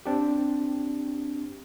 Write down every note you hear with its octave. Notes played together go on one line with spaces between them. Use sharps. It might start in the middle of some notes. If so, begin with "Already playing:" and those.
C4 D4 G4